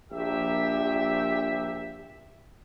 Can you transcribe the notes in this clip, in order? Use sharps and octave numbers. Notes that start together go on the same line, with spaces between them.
A#1 G4 E5